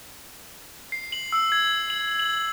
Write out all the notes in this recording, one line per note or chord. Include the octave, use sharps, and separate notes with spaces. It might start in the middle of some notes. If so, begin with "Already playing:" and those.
C7
F#7
E6
G#6
F#7
F#7